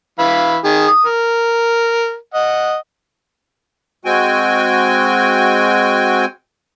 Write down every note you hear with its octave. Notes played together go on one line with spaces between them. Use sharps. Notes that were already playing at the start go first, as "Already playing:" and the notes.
E3 F5 B5
D#3 G#4
D#6
A#4
D#5 F#5
G#3 C4 F#4 G5 G#5